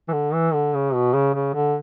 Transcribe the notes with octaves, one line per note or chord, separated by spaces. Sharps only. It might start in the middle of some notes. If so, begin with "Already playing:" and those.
E3
D3
E3
D3
C#3
B2
C#3
C#3
D3